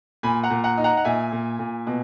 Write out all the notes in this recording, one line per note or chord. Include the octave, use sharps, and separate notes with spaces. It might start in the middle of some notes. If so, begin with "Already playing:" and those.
A#2 G#5 B5
F#5 A#5
A#2
F#5 A#5
D#4
F#5 A#5
F#5
A#2 E5 G#5
A#2
A#2
B2